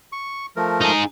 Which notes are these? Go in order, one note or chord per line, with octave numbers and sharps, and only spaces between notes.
C#6
F3 A3 A#4
D#4 G#4